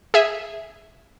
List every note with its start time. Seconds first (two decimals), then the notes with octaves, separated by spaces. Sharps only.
0.14 G#4 E5